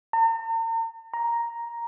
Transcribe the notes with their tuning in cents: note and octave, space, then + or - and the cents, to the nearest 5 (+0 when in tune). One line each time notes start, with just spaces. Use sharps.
A#5 -45
A#5 +5